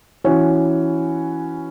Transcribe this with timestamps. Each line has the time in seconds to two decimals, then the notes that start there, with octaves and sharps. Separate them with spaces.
0.24 E3 C#4 F#4